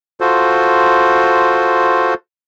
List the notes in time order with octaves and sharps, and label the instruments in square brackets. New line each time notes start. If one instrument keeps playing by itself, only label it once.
[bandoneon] F4 F#4 A4 C5